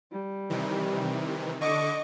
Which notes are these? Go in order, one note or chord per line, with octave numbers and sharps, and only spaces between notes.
G3
C3 D#3 E3
D3 D#5 C#6 D6